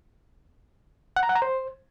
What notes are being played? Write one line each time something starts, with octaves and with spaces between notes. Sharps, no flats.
F#5
A#5
F#5
A#5
C5